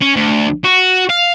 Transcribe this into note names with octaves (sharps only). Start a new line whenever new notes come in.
C#4
D2
F#4
F5